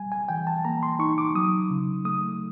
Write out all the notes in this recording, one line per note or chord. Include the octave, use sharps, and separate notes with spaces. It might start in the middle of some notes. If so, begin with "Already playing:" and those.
Already playing: G3 G#5
G#5
E3 G5
A5
A#3 A#5
C6
D#4 C#6
D6
F#3 D#6
C#3
A3 D#6